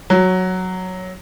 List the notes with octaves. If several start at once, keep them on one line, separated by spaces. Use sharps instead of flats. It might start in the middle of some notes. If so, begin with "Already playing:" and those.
F#3